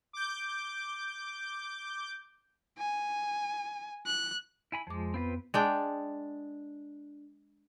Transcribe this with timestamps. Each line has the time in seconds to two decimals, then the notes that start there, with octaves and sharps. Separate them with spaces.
0.13 D6 G6
2.78 G#5
4.06 F#6
4.72 E4 G#5 B5
4.87 F2 F3 G#3 D6
5.14 B3 C4 F4 B4
5.54 G#3 D4 G5